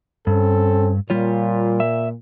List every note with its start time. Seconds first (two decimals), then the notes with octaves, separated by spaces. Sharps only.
0.27 G2 C4 C#4 A4
1.10 A#2 G3 F4 C#5
1.80 E5